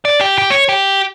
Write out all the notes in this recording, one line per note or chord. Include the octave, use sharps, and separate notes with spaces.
D5
G4
G4
C#5
G4